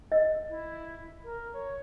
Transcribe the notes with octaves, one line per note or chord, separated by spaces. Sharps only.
D#5
E4
A#4
C#5